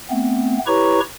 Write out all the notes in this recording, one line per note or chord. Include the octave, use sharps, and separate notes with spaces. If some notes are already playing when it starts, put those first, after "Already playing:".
A3 B3 C4
E4 G4 B4 C#5 A#5 C#6